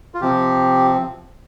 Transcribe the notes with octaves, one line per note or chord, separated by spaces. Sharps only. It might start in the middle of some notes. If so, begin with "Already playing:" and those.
F4
C3 F3 C4 G4